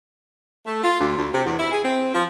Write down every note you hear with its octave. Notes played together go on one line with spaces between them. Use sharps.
A3
F4
D2
D2
C3
E2
E4
G#4
C4
F3